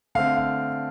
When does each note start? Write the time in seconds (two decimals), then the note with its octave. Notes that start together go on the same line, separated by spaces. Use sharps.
0.15 D3 A3 C4 F5
0.37 F5